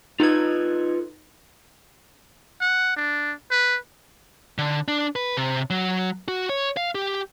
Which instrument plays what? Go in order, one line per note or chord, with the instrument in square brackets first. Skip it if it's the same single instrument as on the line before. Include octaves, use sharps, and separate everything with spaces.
[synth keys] D#4 G#6 [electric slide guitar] F4 A4 B4
[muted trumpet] F#5
D4
B4
[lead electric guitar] D3
D4
B4
C3
F#3
F#4
C#5
F5
G4